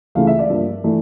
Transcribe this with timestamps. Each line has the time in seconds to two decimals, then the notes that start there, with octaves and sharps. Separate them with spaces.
0.15 C#2 C#3 E3 A3 F5
0.27 E5
0.39 D5
0.49 G2 F3 A#3
0.84 E3 A3